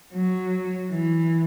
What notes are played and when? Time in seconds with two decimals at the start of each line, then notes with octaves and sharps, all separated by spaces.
0.13 F#3
0.92 E3